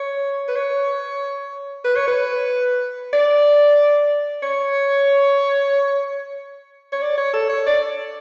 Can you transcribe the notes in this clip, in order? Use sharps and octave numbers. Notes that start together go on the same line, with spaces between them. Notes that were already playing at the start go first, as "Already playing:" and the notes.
Already playing: C#5
B4
C#5
B4
C#5
B4
D5
C#5
C#5
D5
C#5
A4
C#5
D5